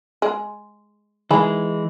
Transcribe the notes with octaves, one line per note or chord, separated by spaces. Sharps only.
G#3
D#3 E3 G#3 G#4 B5